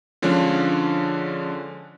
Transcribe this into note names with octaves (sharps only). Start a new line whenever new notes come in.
D3 F3 G#3 C#4 D4